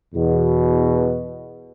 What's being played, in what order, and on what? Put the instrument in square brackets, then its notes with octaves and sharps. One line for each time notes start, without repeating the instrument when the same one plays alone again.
[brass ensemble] E2 B2